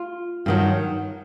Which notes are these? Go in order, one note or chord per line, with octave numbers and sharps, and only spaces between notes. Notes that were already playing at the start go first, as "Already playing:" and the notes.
Already playing: F4
G2 D#3 F#3